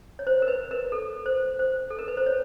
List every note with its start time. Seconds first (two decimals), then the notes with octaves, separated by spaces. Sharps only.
0.19 C#5
0.27 C5
0.42 A#4
0.48 B4
0.71 A#4
0.92 A4
1.26 C5
1.59 C5
1.90 A4
1.99 A#4
2.08 B4
2.17 C5
2.26 C#5